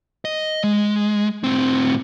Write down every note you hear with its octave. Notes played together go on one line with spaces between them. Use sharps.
D#5
G#3
A2 C4